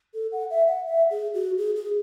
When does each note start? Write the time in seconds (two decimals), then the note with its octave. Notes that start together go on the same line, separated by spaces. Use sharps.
0.14 A4
0.32 F#5
0.50 E5
0.68 F#5
0.86 E5
1.11 G#4
1.34 F#4
1.58 G#4
1.76 G#4